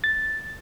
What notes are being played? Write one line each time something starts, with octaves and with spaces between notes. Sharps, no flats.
A6